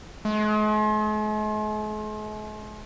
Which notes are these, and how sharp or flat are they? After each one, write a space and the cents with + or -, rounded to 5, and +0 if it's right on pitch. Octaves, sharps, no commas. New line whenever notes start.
G#3 +45